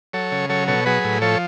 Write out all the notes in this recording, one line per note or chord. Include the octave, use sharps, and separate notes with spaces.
F#3 A4 C#5
C#3
F#3 A4 C#5
B2 A4 C#5
F#3 G#4 B4
A2
F3 A4 C#5